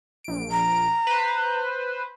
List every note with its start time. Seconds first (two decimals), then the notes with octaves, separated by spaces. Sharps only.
0.24 A#1 D7
0.52 A#5
1.07 B4 C5